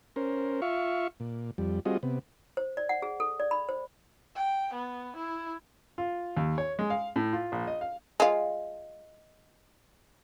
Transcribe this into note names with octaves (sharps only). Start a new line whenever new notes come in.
C#4 A#4 C5
F4 E5 F5 C#6
A#2
F2 G3
G3 C4 F4 F#4 G#4 D#5
C3 B3
C5
D5
F#5
G#4
A4
D5
B5
C5
G5
B3
E4
F4
D#2
C#5
G#3
F5
A2
F4
A#1
D#5
F5
G#3 F4